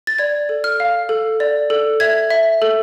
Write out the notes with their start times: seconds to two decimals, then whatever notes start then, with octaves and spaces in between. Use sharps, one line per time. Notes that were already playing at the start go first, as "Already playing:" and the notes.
0.07 A6
0.19 D5 G#6
0.49 A4
0.64 F6
0.80 F5
1.09 A4
1.40 D5
1.70 A4
2.00 E5 G#6
2.30 E5
2.62 A4